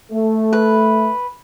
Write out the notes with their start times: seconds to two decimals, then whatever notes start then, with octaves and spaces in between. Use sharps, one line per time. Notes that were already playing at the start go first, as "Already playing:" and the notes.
0.12 A3
0.53 B4